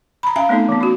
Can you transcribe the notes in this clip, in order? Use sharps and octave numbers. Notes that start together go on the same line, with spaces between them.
A#5 B5
C#4 E5 F5 G#5 A#5
A3 B3 C4 D#4 A4
E3 B3
C#4 F#4